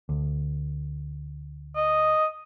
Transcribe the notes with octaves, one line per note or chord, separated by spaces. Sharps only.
D2
D#5